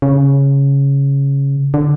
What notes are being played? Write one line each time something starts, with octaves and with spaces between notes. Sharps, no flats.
C#3
D3